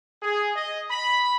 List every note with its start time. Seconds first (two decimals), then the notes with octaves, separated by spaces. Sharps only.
0.23 G#4
0.54 D#5
0.89 B5